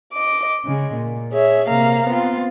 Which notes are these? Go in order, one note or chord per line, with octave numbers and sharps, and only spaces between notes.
D#5 D6
C#3 G#3
A#2
G#4 C#5 E5
C3 A#3 F5 A#5
B3 C4 F4